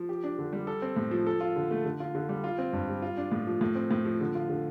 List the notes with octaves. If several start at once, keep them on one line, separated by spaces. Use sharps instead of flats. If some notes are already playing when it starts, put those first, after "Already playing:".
Already playing: F3
G4
D4
D3
G3
A4
C4
A2
F3
A4
F4
D3
A3
D3
F4
D3
G3
F4
C4
G2
G3
F4
D4
A2
F3
A2
C4
A2
F3
D3
F4
D3